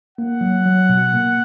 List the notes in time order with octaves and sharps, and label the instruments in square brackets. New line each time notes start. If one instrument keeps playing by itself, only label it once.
[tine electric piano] A#3 [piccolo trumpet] F#5
[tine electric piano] F#3
F#3
B2
A#3